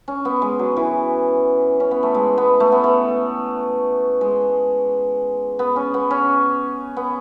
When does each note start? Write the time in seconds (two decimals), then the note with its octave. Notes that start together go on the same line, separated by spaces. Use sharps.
0.08 C#4
0.25 B3
0.42 G#3
0.59 F#3
0.77 E3
1.80 C#4
1.91 B3
2.03 A3
2.15 G#3
2.37 B3
2.60 A3
2.72 B3
2.84 A3
4.21 G#3
5.59 B3
5.76 C#4
5.94 B3
6.11 C#4
6.97 B3